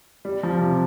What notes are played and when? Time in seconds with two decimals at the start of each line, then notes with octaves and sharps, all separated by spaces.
0.25 G3
0.43 F3
0.61 C3